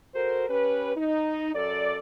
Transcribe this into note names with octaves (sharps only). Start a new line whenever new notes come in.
F#4 A4 A#4 C5
C#4 G4 B4
D#4
F#2 A4 D5